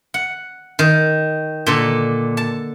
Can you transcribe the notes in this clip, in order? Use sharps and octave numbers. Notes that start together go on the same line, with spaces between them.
F#5
D#3
A#2 D3 A4
A5